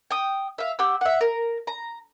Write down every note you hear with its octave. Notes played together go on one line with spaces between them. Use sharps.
G5 D#6
E5 F5
G4 F#5 E6
E5 F#5
A#4
A#5